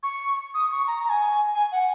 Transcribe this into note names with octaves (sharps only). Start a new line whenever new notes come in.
C#6
D#6
C#6
A#5
A#5
G#5
G#5
F#5